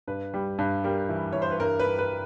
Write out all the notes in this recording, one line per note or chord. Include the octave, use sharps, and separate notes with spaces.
G2 B4
G3
G2
G3 A#4
E3
E3 C#5
C5
B4
G2 A#4
B4
G2
B4